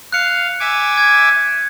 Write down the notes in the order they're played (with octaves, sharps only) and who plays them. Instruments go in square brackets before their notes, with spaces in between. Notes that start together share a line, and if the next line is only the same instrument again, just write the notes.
[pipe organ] F5 [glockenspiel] F#6 C#7
[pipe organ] E5 G#5 D6
[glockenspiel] G#6